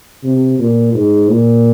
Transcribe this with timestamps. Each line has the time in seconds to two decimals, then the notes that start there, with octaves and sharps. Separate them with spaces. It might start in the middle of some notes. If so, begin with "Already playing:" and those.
0.24 C3
0.59 A#2
0.94 G#2
1.29 A#2